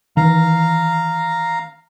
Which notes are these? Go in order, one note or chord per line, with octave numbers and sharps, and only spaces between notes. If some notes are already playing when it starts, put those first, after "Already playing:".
D#3 E3 F5 A#5